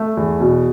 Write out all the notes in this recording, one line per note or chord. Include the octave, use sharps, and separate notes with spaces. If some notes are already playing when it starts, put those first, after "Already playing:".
Already playing: A3
E2
B2